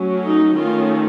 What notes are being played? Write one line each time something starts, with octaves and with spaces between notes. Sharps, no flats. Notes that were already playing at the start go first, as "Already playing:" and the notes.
Already playing: F#3 A3 C#4
D#4
D#3 A3 C#4 F4